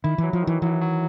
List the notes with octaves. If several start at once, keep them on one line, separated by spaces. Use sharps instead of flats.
D#3 E4
E3 F#3
F3
D#3
E3
E3 F#3
F#3